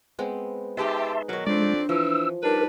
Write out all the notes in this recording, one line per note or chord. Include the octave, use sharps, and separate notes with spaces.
G#3 B3 C4
D#4 G4 G#4 B4 E5 A5 C6
B2 D#3 F#3 A#4 C#5
F2 G#3 C4 D4 D5
E3 F3 E6
G3 D4 D#4 A#4 B4